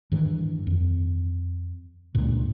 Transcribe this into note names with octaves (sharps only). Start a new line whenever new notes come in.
G2 D#3 E3
F2
C#2 G2 A#2